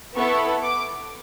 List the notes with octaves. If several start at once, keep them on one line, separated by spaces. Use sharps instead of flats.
B3 E4 A4 C#6
D6